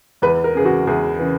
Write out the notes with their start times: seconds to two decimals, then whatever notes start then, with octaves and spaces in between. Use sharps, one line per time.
0.22 E2 B4
0.44 A#4
0.55 C#3 E3 G#4
0.65 F#4
0.87 E2 G#4
1.19 C#3 E3